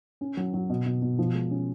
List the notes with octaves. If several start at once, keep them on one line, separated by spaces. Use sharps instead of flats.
C#4
F#3
F#3
B2
B2
B2
F3
G#3
C#4